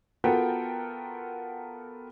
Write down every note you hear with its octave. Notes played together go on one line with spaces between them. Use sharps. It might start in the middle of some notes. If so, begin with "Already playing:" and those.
B3 F4 F#4 A4 A#4 G5